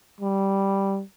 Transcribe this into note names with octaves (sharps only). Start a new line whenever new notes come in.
G3